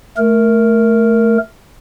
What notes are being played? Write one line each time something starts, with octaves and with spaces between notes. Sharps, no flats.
A3 A#4